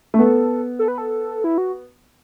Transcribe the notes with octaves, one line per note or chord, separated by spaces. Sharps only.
A3
B3 A4
A4
B4
A4
E4
F#4